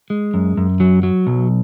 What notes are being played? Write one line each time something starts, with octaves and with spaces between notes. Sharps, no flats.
G#3
F#2
F#2
F#3
F#3
B1